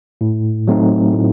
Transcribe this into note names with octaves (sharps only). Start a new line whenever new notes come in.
A2
F#3 A3 C4 D#4
A2